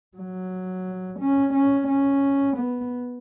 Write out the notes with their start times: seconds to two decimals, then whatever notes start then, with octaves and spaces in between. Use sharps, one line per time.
0.17 F#3
1.20 C#4
1.54 C#4
1.87 C#4
2.57 B3